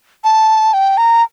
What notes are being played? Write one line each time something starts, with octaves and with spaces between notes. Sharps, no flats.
A5
G5
A#5